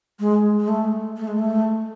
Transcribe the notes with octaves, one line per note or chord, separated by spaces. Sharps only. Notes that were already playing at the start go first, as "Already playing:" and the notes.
G#3
G#3
A3
A3
G#3
A3